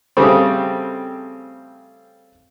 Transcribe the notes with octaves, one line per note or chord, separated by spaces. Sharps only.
C#3 G3 A3 C4